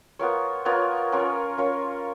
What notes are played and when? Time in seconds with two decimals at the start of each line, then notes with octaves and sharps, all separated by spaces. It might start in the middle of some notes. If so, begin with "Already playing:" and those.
0.19 B3 F4 A#4 C#5
0.65 B3 F4 A#4 C#5
1.12 C#4 F4 A#4 C#5
1.58 C#4 F4 A#4 C#5